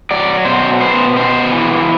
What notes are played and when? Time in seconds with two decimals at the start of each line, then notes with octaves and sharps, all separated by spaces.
0.11 F#3 D5
0.45 B2 C5
0.80 B3 C5
1.16 B2 C5
1.52 E3